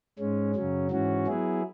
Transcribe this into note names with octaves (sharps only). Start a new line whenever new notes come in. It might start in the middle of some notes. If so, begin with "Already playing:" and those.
G#2 G#3 C#4
F#2 C#3 F#3 C#4
G#2 E3 C#4 F#4
F#3 B3 E4 G#4